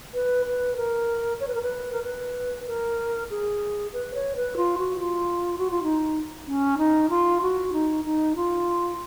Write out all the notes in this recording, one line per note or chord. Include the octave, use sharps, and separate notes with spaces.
B4
B4
A#4
C#5
B4
A#4
B4
A#4
B4
A#4
G#4
B4
C#5
B4
F4
F#4
F4
F#4
F4
D#4
C#4
D#4
F4
F#4
D#4
D#4
F4